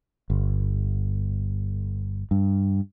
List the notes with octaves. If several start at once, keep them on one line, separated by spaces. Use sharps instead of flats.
G1
G2